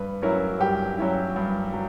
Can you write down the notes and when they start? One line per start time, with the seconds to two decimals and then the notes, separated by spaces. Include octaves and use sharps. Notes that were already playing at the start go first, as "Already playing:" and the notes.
Already playing: G2 B4
0.22 F#3 C#4 E4 A#4
0.60 G2 G4
0.98 F#3 C#4 E4
1.36 G2
1.73 F#3